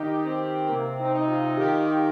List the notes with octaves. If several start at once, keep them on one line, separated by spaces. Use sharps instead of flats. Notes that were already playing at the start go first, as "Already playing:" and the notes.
Already playing: D#3 D#4 G4
C4
C3 A#3
D#4
D#4
F4
D#3 G4